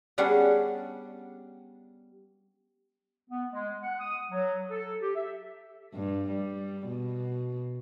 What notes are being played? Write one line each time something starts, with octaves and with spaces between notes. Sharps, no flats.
G3 B3 C#4 D4 G#4 F#5
B3
G#3
F#5
D#6
F#3
A4
G4
E5
G2
G3
B2